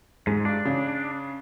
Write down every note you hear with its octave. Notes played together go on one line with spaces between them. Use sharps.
G#2 G#3
G2 D4
C#3